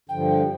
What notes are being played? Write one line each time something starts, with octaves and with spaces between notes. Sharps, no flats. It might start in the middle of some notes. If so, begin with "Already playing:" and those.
G2 D3 F3 G5